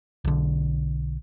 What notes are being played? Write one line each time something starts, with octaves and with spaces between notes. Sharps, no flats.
B1 D3